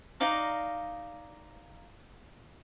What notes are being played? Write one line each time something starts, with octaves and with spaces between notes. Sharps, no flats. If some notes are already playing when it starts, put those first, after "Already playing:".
D#4 D5 F5 A#5